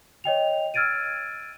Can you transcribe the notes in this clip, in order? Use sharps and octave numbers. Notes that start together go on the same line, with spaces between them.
C#5 D#5 G5 F7
E6 F6 G#6 A6 D7 D#7